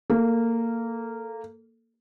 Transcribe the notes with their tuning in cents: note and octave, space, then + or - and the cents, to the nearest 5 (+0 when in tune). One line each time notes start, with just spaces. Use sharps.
A#3 -15 A4 +0